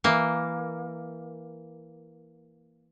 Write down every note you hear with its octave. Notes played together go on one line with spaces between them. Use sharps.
E3 A#3